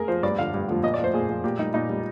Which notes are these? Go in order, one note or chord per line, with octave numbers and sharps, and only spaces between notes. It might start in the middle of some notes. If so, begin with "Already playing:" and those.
Already playing: G#4 A#4
F3 C5
G2 D5
D3 F3 F5
G2
D3 F3
A#2 D#5
D5
F3
C5
A#2 G#4
F3
A#2 G4
G3 D#4
A#2 D#4
G3